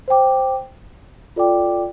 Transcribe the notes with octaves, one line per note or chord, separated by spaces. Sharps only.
C5 G5 D6
F4 A4 D5 G5 D6